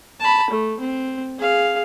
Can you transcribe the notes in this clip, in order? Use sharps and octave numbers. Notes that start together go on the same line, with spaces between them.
A5 B5
A3
C4
G#4 F5